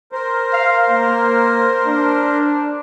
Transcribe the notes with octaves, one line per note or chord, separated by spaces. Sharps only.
A#4 C5
F5
A#3
D4